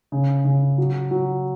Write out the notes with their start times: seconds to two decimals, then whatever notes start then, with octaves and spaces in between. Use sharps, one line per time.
0.12 C#3
0.45 C#3
0.78 F#3
1.11 F#3